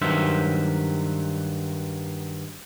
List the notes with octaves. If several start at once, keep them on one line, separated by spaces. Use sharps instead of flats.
G2 D#3 F#3 C5 E5